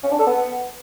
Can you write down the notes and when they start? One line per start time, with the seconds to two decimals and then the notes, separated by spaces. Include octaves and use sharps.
0.04 C#4
0.11 D4
0.19 A4
0.27 B3